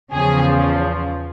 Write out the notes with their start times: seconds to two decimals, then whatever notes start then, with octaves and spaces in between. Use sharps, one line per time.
0.15 E2 C#3 F3 G#4